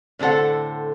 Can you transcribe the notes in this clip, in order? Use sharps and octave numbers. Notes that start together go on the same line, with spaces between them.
A2 D3 C4 A4 F#5